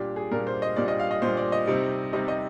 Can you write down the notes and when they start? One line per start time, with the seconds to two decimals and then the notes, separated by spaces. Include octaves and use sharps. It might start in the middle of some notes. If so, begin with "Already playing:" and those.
Already playing: A#2 G3 D4 G4
0.16 G#4
0.31 A#2 G3 D4 A#4
0.47 C5
0.62 D#5
0.76 A#2 G3 D4 D5
0.88 D#5
0.99 F5
1.11 D#5
1.22 A#2 G3 D4 C5
1.37 D5
1.52 D#5
1.67 C3 G3 C4 D#4
2.13 C3 G3 C4 D#4 D#5
2.28 D#5